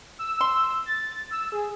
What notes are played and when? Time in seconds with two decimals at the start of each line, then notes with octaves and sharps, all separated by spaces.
0.19 E6
0.41 C6
0.86 A6
1.31 E6
1.52 G#4